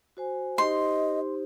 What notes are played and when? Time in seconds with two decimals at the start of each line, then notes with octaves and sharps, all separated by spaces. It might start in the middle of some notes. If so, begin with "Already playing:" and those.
0.17 F#4 C5 G#5
0.58 D#4 G4 C5 D#5 C6